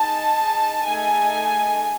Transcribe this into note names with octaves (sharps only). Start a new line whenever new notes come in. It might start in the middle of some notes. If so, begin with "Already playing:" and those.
Already playing: D#4 G#4 A5
A3 D#4 G#4 G#5